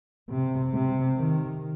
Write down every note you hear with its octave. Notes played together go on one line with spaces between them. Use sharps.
C3
C3
D#3